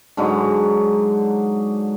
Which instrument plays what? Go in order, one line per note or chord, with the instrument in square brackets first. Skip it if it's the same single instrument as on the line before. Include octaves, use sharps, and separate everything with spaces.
[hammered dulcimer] G#2 D3 F#3